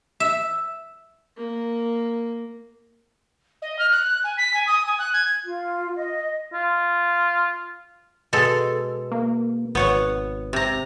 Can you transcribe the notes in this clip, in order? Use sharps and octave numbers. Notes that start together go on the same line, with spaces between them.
E5
A#3
D#5
F6
F#6
F#6
G#5
B6
G#5
D#6
G#5
F#6
G#6
F4
D#5
F4
B2 G#3 A4
A#3
G#1 B3 C#5 F#5
C3 A#5